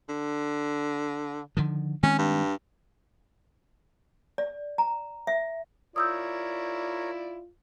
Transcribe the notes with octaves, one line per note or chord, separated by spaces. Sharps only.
D3
D3 D#3 F3
D#3 G#3 C4 C#4
G2
D5
A#5
E5
E4 F4 A#4 C#5 D5 D#6 E6 G6